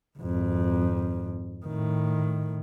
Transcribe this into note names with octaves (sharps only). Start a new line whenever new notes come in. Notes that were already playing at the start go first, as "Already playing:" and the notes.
G#1 F2
A2 D#3